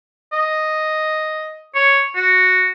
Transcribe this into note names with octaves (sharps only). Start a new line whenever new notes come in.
D#5
C#5
F#4